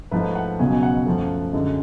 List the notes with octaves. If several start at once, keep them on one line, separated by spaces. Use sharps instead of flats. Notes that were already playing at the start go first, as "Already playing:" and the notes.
G#2 F3 A3 B4
F#5
C#2 B2 F#3 B3 G#5
F#5
F#2 F3 A3
F#2 D3 G#3